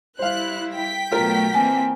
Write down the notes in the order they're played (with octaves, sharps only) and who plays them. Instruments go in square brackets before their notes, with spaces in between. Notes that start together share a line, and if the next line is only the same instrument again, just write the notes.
[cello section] G3 E4 [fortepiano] C5 F5 [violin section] F#6
[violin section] G5 B6
[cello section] B2 F#3 A3 [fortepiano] F4 A#4
[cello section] E3 A#3 C4 [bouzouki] D#4 G#5 A5